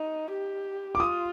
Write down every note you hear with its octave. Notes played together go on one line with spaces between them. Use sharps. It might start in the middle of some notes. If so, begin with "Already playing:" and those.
Already playing: D#4
G4
D6
F4 D#6